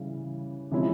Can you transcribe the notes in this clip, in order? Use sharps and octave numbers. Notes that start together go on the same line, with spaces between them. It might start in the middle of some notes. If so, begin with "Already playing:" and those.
Already playing: C#3 E3 G3
C3 F3 G#3 C#4 E4